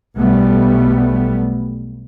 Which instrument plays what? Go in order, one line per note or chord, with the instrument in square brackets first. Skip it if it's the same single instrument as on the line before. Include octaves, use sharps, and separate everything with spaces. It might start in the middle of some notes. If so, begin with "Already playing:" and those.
[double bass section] B1 G3 A3 B3